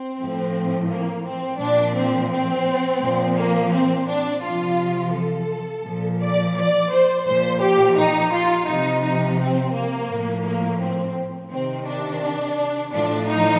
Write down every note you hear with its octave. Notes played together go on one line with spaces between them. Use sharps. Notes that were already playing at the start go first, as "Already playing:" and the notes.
Already playing: C4
A2 F3
A#3
C4
A#2 F3 D4
C4
C4
A#2 F3
A#3
C4
D4
C3 F3 F4
A4
A#2 F3
D5
D5
C5
A#2 F3 C5
G4
D#4
F4
C3 F3 D#4
D#4
C4
A#3
A2 F3
A#3
C4
C3 D#3 C4
D4
A2 F3 D4
D#4